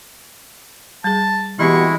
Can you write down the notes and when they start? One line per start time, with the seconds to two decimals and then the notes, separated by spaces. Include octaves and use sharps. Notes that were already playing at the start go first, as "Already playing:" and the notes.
1.04 G3 G#4 A5
1.59 B2 E3 G#3 C4 E4 G4 C#6